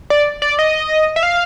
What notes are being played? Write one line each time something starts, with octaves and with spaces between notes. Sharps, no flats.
D5
D5
D#5
E5
F5